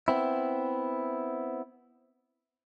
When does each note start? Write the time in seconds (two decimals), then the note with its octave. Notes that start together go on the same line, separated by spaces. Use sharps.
0.08 B3 C4 E4